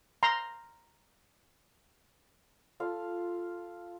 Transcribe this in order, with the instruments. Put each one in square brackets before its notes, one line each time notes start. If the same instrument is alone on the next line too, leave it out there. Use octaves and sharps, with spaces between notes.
[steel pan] A#5 C6
[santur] F4 A4 F5